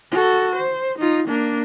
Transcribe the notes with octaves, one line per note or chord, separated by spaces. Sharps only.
F#4 A4
C5
D#4 F4
A#3 D4